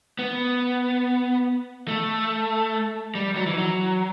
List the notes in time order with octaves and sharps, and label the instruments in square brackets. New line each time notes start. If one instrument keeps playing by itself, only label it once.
[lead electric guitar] B3
A3
G3
F#3
E3
F#3